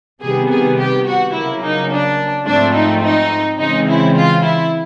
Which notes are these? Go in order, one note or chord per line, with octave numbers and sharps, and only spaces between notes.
C3 D#3 G3 B3 G#4
G#4
G4
F#4
C#3 F#3 A#3 E4
D#4
D4
G#2 F3 A3 C4 D4
D#4
D#4
C#3 E3 G#3 C4 D#4
E4
F4
E4